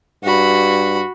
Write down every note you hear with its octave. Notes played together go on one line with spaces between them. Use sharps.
G2 F#4 B5